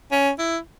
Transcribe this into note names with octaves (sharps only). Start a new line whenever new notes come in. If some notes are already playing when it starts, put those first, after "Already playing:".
C#4
E4